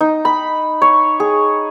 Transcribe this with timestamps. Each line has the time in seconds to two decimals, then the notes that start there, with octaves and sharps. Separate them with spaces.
0.01 D#4
0.25 B5
0.82 C#5
1.20 G#4